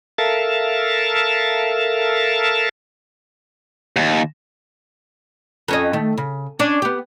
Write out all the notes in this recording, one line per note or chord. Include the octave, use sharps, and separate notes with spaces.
A4 A#4 E5 F5 A5
D#2
F2 C#4 D#5
D#3 A3
C#3
C#4 D4
B3 G4